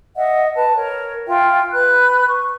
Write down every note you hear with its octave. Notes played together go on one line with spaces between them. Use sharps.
D#5 E5 F#5
B4 A5
A#4 C#5
F4 E5 G5
B4 B5 F#6
C#6